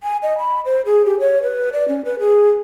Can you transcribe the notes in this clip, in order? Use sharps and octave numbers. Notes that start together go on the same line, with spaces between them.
G#5
D#5
B5
C5
G#4
G4
C#5
B4
D5
C#4
B4
G#4